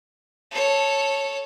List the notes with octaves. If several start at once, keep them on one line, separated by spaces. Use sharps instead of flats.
A4 C#5